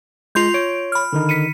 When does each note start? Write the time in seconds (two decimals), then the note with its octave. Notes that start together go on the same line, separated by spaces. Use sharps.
0.35 G#3 F4 C6 G6
0.54 C#5 D7
0.92 B5 F6
1.13 D3 D#3 D#4
1.29 B6 C#7 D#7